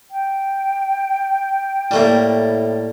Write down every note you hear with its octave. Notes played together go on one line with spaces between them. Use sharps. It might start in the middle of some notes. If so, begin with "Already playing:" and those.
G5
A2 G3 A3 A#3